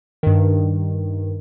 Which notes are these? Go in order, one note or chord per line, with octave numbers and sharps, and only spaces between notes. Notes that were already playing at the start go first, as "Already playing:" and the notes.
G2 D#3